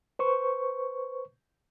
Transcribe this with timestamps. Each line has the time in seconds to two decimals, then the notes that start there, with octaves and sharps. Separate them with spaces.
0.19 B4 C5 C#6